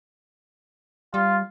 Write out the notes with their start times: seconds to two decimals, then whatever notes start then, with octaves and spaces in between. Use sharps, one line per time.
1.14 G3 F4